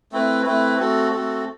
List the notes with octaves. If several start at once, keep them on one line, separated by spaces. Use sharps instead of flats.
A3 C4 E4 B4
A3 C4 E4 B4
A3 C4 F#4 A4
A3 C4 F#4 A4